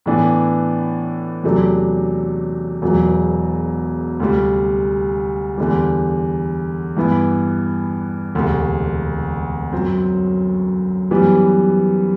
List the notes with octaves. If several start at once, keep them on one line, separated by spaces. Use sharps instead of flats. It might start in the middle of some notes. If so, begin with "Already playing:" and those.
A2 E3 B3 D4
E2 C3 F#3 A3 D4
E1 E2 B2 F#3
D2 C3 G3
E2 D3 G3
G2 E3 B3 E4
E1 D2 C3
F#2 F#3 C4
F#2 E3 G3 B3